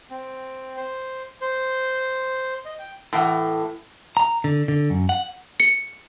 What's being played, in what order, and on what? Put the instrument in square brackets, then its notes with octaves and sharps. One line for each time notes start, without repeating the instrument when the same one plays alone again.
[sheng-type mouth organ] C4
C5
C5
D#5
G5
[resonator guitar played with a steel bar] A2 E3 F#5
[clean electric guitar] A#5
D3
D3
F#2
F#5
[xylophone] C#7